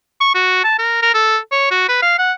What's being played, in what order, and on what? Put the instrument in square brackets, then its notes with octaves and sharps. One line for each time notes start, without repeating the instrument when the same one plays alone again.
[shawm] C#6
F#4
A5
A#4
A#4
A4
C#5
F#4
B4
F5
F#5